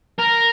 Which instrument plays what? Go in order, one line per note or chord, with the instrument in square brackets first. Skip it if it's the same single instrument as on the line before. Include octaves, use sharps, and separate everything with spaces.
[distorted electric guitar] A#4